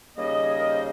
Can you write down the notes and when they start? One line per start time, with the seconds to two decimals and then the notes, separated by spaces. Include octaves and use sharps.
0.17 D#2 C#3 G3 A#3 D#5
0.44 G#4
0.58 A#4
0.71 C5